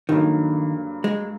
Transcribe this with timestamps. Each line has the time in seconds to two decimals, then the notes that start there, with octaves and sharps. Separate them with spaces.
0.09 G2 D3 D#3 F#3 A#3
1.04 G#3